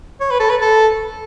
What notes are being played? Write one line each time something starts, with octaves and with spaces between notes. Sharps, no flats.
C#5
B4
A4
B4
A4